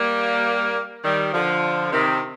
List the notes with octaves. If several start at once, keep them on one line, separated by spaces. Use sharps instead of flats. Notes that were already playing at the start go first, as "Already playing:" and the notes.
Already playing: G3 A#3
D#3 G3
D3 F3
C3 D#3